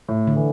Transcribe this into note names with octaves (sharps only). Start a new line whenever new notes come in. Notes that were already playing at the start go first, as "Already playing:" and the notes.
A2
D3
E3